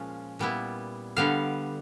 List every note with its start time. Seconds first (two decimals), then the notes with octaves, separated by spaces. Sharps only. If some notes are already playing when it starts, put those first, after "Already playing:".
Already playing: A#2 F3 G#3 C#4 F4
0.39 A#2 G3 B3 E4
1.16 D3 G3 B3 F5